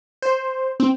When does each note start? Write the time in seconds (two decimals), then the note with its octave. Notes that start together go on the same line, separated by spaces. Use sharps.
0.22 C5
0.80 C4